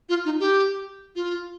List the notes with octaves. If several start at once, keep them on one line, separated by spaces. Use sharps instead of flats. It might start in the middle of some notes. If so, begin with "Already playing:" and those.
F4
D#4
G4
F4